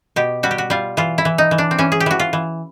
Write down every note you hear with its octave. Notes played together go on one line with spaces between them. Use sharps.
B2 G4
G3 F#4
G4
F#4
G3 F4
E3 F4
E4
E3
D#4
E3
D4
C4
E3 C#4
G#4
G4
E3 F#4
F4
E3